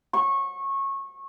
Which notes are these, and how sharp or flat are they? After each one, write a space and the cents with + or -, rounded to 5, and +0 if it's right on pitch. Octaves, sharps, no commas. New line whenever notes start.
C#6 -20